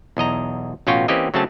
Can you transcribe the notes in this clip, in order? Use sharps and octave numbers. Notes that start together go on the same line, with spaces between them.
B1 E2 D#5 A#5
A1 B2 C#4 F4 F#4 G5
E3 A#3 C4 C#4 G4 D#5
C#3 F#3 A3 C4 C#4 A5